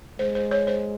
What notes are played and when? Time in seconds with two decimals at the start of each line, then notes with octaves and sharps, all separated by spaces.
0.19 G#3 C5
0.35 C5
0.51 C#5
0.67 C5